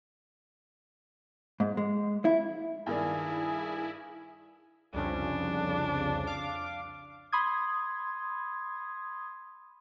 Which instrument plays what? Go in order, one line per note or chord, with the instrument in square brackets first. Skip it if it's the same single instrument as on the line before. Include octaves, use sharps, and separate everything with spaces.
[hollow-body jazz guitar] G#2
G#3
E4
[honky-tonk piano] G2 D#3 D5 [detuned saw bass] E4 [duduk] G#4 [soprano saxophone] G#5
[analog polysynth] C2 F2 C#3 [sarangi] D4
[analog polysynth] F5 D6
[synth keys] B5 C6 D#6 G#6